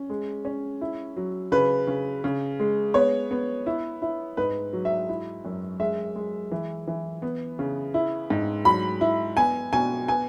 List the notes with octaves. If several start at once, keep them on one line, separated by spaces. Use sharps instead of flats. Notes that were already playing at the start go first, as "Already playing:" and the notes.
Already playing: C#4
G#3
C#4
E4
F#3
C#3 B4
C#3
C#3
G#3
B3 C#5
B3
E4
E4
G#2 B4
F#3
E5
E4
F#2
G#3 E5
G#3
E3
E3
B3
C#3
E4
G#2
F#3 B5
E4
B3 G#5
B2 G#5
B3 G#5